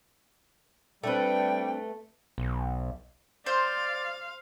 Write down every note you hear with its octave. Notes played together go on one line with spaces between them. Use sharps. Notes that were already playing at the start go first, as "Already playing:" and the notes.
G3 A3 C4 D4 A4 B4 G5
B1
C5 D5 F5